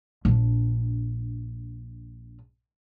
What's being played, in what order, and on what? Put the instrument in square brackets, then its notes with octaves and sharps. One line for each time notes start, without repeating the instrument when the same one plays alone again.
[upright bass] A#1 D4